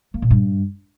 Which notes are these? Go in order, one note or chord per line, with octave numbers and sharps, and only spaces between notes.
A#3
A#2
G2